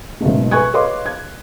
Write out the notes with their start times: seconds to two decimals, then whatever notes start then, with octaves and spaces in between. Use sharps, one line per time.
0.21 F#1 G#2 B2 A3
0.51 B4 G#5 C#6 F#6 G#6
0.74 B4 C#5 D#5 F5 C6 D6
1.06 G#6